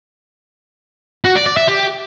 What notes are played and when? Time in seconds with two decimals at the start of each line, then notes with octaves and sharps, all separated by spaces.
1.24 F#4
1.35 D5
1.46 D5
1.57 E5
1.68 G4